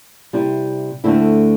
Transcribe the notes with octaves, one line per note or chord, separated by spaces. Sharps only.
C3 G3 E4
D2 D3 A3 C4 E4